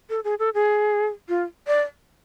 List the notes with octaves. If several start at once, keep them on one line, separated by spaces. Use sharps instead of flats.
A4
G#4
A4
G#4
F4
D5